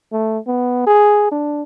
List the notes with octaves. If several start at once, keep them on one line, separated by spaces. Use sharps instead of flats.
A3
B3
G#4
D4